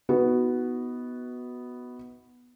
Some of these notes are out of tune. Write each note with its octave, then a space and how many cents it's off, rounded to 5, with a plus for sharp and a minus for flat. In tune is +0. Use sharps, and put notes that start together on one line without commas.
B3 +0 D#4 +35 F#4 +0